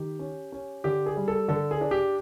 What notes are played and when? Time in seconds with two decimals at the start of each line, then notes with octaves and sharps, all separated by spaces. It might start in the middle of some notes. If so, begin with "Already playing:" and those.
Already playing: D#3 G4
0.19 C#4
0.52 C#4
0.84 D3 G4
1.06 G#4
1.16 G3
1.28 A4
1.48 D3 A4
1.71 G#4
1.81 D4
1.91 G4